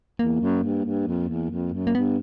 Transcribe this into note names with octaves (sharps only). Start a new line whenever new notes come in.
E2 A#3
F#2
G2
G2
F2
E2
F2
F#2
A#3
G2 B3